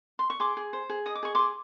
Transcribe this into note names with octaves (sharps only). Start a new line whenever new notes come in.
C6
C#6
G#4 C6 D6
G#4
C5
G#4
D#5 D#6
D6
G#4 C#6
G#4 C6 D6